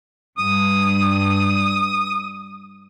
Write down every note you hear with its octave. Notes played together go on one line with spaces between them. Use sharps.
G2 D#6